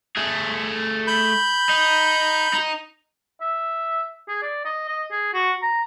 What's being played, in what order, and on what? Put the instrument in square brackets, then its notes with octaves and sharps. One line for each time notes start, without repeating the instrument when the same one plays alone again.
[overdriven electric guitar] A3 G#4
[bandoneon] B5 G6
[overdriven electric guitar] D#4
D#4
[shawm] E5
G#4
D5
D#5
D#5
G#4
F#4
A#5